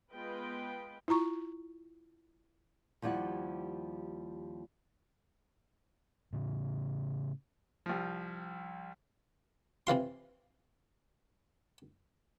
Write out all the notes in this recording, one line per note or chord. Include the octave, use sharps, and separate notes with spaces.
G#3 B3 F4 B4 D#5 G5
E4 F4 A#5 C#6
D#2 F3 G3 E4 F#5
A2 C#3
C2 F3
C3 E3 F4 C6